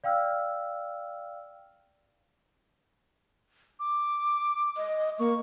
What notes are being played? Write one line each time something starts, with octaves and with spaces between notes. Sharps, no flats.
D5 F5 G5 E6 F6
D6
D#5
A#3 C#6